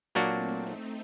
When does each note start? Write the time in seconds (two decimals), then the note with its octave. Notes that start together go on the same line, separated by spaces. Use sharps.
0.15 A#2 F#3 A3 A#3 C4 D4 F#4
0.51 C4 D#4